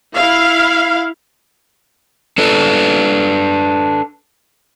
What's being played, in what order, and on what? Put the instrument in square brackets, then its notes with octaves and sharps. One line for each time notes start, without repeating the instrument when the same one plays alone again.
[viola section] E4 F5
[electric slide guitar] D4 A4 B4